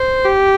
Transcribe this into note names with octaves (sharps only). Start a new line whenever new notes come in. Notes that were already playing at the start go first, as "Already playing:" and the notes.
Already playing: C5
G4